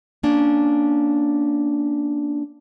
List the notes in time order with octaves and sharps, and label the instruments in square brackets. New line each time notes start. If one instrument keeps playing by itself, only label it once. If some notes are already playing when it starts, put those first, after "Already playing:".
[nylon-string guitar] A#3 C#4 D4